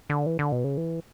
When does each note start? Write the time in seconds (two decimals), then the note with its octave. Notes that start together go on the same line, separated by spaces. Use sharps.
0.10 D3
0.26 E3
0.39 D3
0.52 B2
0.64 C#3
0.77 E3